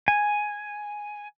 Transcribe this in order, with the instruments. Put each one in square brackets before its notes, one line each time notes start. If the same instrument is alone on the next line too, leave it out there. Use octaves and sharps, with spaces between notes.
[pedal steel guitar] G#5